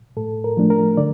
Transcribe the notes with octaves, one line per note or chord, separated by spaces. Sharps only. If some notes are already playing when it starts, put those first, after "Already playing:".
A2 A4
A#4
F3 A3 D4
A#4
D3 D5